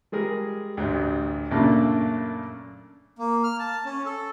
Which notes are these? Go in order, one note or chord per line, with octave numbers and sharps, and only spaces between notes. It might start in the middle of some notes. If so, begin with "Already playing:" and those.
G3 G#3 G#4 A#4
A1 D2
F#2 A#2 C#3 A3 A#3 D4
A#3
F6
A5
C#4
A4